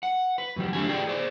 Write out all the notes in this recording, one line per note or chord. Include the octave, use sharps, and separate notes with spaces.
F#5
B4
F#2 D#3 G3
F#2 A3 D4 G4 G#5
F4 G4 G#4 B4 D5 G5
G#4 C5 D5